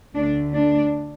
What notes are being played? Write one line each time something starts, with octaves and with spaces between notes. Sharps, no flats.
D2 D3 A3 D4
D4